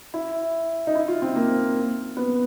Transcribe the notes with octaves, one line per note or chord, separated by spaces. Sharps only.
E4
D#4
E4
F4
C4
A#3
B3